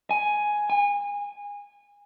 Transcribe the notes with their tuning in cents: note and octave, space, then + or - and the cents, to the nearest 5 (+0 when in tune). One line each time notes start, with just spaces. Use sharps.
G#5 +5
G#5 -25